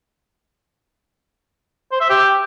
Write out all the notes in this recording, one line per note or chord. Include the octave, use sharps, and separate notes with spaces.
C5
E5
G4